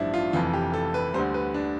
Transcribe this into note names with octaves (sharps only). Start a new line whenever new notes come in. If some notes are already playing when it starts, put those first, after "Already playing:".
Already playing: A1 G2 F3 D4 E4
F4
F1 F2 E3 F4
G4
A4
B4
D2 D3 G3 C5
B4
D4